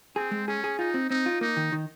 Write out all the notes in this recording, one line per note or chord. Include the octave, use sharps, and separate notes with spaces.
C4 G#4
G#3
C#4 G#4
G#4
D#4 F4
C4
C4 D#4
F4
A#3 D#4
D#3
D#3